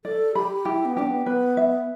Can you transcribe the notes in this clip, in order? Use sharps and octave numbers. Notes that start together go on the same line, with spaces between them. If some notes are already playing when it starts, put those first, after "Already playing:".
A4 D5
G4 B5
E4 G4
B3
D4 G4
B3
B3 B4
E5